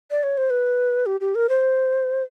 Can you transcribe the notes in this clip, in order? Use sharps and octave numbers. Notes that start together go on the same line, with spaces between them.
D5
C#5
C5
B4
G4
G4
A#4
C5